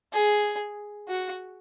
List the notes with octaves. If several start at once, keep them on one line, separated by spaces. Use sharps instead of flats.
G#4
F#4